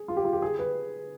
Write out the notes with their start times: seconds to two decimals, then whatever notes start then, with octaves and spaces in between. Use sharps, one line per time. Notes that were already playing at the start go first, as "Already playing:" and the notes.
Already playing: G#4
0.08 F4
0.17 G4
0.25 F4
0.33 G4
0.42 G#4
0.59 B4